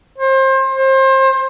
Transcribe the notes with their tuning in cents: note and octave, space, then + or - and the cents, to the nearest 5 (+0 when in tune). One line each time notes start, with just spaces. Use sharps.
C5 +30
C5 +30